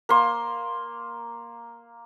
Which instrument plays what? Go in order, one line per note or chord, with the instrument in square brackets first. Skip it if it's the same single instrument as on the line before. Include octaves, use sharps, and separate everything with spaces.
[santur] A#3 C6